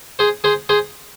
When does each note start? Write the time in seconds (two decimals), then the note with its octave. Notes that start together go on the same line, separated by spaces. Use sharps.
0.19 G#4 C5
0.44 G#4 C5
0.69 G#4 C5